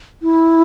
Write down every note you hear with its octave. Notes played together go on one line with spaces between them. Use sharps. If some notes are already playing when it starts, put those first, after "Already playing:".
E4